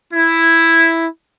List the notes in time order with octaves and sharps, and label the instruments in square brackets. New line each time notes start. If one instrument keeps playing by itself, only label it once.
[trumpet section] E4